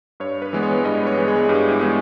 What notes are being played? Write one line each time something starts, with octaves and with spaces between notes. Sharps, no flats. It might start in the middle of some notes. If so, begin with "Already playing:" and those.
G2 C#5
B4
E3 G#3 B3
C#5
G2 D#5
C#5
E3 G#3 B3
G#4
G2 G4
E4
E3 G#3 B3